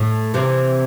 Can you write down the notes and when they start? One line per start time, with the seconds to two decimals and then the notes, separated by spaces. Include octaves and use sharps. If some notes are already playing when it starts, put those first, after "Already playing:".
Already playing: A2
0.34 C3 E3